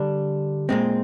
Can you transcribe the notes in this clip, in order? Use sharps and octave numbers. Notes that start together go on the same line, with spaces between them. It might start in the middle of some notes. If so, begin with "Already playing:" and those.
Already playing: D3 G3 D4
A#2 G#3 C4